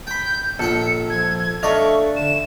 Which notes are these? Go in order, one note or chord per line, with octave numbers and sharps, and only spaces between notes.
G5 B5 G6
A#1 A4 F#5 G5 C#7
F3 G#6
G#6
A3 D4 A4 D5 D#5 F5 C#6
D3 E7